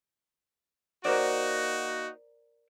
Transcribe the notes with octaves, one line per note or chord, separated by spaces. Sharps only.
A#3 D#4 F#4 A#4 C5 D5